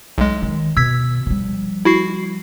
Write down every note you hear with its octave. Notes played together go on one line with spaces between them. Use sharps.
B1 G#3
D#3
B2 E6 G#6 B6
F3 G3
E4 F#4 C7